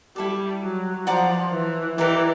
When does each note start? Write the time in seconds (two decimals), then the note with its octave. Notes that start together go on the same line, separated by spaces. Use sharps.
0.16 G3 E4 A4 D5
0.61 F#3
1.06 F3 D5 F#5 A#5 D6
1.52 E3
1.97 E3 D#4 G4 A#4 D5